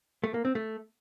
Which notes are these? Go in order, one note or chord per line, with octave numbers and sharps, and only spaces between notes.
A3
A#3
C4
A3